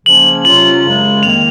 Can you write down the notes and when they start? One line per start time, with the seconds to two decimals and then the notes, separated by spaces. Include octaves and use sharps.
0.05 C#3 F3 A#3 C#4 F#7
0.45 C3 F#3 C#4 F4 F#7
0.84 F#2 C#3 G#3
1.23 F2 D#3 A#3 F7